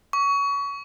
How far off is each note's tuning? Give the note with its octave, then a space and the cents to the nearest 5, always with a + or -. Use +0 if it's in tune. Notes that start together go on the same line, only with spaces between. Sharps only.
C#6 +25